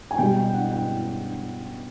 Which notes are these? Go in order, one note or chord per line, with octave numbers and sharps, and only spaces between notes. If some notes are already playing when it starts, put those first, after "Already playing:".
G#5
B2 G3 G5
G5
F#5
G5